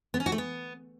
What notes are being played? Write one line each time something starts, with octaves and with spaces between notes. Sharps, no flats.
B3
C#4
F#4
A3
B3